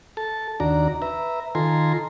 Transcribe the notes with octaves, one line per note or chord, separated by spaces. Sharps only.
A4 A5
D#2 D4 F#4 D5 A#5
B4 E5 A#5
D#3 F4 A4 G#5 A#5 C6